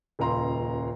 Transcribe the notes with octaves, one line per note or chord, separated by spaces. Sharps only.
D#1 C#2 A#5 C6